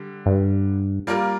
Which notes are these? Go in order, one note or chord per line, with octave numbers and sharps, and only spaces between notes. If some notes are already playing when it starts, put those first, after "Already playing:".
Already playing: D3 G3
G2
G3 A#3 F4 A#4